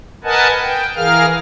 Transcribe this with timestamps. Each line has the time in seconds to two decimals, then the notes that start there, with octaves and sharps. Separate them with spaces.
0.24 A#4 B4 D#5 F#5 G#5 A5
0.61 G5
0.96 E3 G#4 A#4 F5 F6